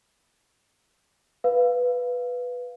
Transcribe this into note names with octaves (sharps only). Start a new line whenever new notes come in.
B4 F5